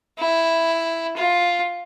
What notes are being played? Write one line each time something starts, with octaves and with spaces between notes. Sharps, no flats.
E4
F4